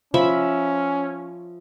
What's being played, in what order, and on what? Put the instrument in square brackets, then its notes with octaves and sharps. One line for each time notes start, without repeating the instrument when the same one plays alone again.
[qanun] F3 E5 B5 [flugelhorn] C#4